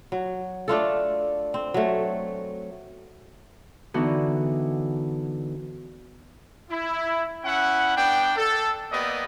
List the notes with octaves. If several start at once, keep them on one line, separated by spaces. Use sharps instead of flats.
F#3
A3 D4 F4 A4
C4
F#3 A3
D3 E3 B3 D4 D#4 F#4
E4
C#4 E4 F#5
B3 D4 G5
A4
A#3 B3 G4 D5 D#5